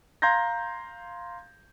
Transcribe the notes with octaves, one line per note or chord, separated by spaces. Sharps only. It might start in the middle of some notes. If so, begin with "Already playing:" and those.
F5 A#5 C6 G6 G#6 A#6